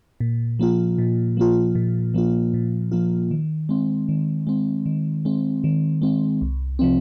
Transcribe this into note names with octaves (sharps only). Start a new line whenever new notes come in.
A#2
F3 A#3 F4
A#2
F3 A#3 F4
A#2
F3 A#3 F4
A#2
F3 A#3 F4
D#3
G#3 C4
D#3
G#3 C4
D#3
G#3 C4
D#3
G#3 C4
C2
C3 F3 C4